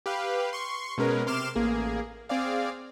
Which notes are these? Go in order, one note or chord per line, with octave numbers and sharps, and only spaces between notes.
G4 B4 F5
C6 C#6
B2 G#3 C#4 A#4 B4
C3 C6 D6 F6 E7
A1 A#3 G#4
C4 G#4 D5 F5